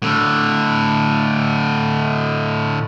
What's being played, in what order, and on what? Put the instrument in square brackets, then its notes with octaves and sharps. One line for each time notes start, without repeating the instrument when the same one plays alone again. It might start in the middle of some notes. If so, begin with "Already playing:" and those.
[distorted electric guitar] A2 D3